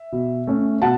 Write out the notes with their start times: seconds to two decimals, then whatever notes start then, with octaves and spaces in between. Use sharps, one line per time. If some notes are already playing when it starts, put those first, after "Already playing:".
Already playing: E5
0.12 B2
0.47 A3 C#4
0.82 B2 F#5 A5